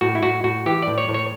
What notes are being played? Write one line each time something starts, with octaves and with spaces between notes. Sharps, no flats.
A2 F#4
E4
A2 F#4
A2 F#4
E3 G4
A2 D5
C#5
A2
C#5